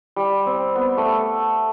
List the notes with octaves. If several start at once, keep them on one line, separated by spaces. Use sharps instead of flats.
G3
C4
B3
A3